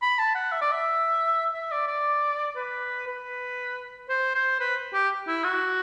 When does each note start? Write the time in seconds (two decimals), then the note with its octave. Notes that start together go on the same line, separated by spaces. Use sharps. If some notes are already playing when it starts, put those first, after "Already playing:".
0.02 B5
0.19 A5
0.35 F#5
0.52 E5
0.62 D5
0.72 E5
1.54 E5
1.72 D5
1.88 D5
2.56 B4
3.07 B4
4.09 C5
4.35 C5
4.60 B4
4.94 G4
5.28 E4
5.44 F#4